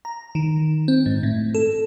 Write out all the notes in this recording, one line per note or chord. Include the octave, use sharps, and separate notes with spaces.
A#5
D#3
C4
G#2
A2
A4